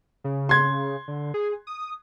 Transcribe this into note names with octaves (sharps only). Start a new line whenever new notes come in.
C#3
C6 G#6
D3
G#4
D#6